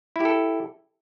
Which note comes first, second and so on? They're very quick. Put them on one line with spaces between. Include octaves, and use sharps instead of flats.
E4 G4 A4